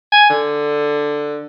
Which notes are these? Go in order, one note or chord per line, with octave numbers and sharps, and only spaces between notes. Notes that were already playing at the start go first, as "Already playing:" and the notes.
G#5
D3